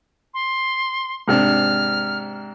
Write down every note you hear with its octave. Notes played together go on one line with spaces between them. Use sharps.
C6
G#2 C3 D4 F6